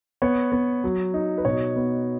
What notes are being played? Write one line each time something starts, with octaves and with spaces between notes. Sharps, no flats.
B3 C#5
B3
F#3
D#4
B4
B2 C#5
B3